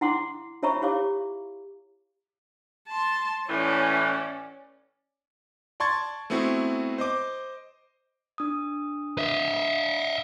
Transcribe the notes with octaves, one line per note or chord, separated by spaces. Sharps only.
E4 F#5 C6 D6
F4 C#5 E5 A#5 B5 C#6
E4 G4 C#5 F5 D6
A5 C6
A2 E3 C#4 D5
D5 A5 C6 C#6 G#6 A6
A3 B3 C4 E4 F#4
C5 D#5 D6
D4 D#6
D#5 E5